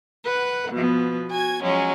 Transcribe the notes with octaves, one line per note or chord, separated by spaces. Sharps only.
B4 F#5
B2 F3 B3
F#4 G#5 G#6
F3 F#3 G#3 C#4